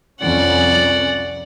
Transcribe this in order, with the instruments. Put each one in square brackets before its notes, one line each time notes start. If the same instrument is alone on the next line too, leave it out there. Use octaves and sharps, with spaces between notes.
[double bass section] C2 F2 C#4 [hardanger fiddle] D5 F#5